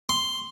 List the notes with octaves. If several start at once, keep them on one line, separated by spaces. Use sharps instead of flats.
C6